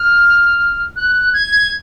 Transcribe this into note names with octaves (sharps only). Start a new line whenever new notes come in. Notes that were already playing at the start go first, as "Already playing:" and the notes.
Already playing: F6
F#6
G#6